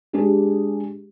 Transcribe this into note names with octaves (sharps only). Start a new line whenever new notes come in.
G#3 D4 G4 G#4